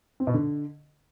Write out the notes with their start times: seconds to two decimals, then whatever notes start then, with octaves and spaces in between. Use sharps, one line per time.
0.20 C4
0.27 B2
0.34 D3